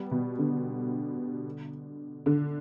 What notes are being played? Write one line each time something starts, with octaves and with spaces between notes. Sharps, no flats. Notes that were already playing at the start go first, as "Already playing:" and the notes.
Already playing: G3 B3
B2
D3
D3